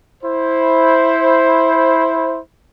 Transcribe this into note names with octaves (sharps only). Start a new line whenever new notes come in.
E4 C5